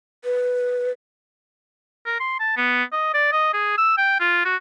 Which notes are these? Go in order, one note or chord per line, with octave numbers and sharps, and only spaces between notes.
B4
A#4
C6
A5
B3
D#5
D5
D#5
G#4
E6
G5
F4
F#4